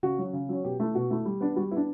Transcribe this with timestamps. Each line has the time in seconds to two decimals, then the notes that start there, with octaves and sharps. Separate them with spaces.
0.03 C#3 F#4
0.18 F#3 C#4
0.33 C#3
0.49 F#3 C#4
0.64 B2 G4
0.80 A3 E4
0.95 B2 F#4
1.10 A3 E4
1.25 G3
1.41 B3 D4
1.56 G3 F#4
1.71 B3 E4
1.77 D4